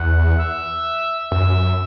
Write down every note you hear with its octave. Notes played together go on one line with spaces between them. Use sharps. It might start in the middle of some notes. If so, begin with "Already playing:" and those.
Already playing: E2 F#5
E5
F#2 E5